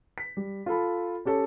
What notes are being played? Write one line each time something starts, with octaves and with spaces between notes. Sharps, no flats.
B6
G3
F4 A4 B5
C#4 G4 A4 C#5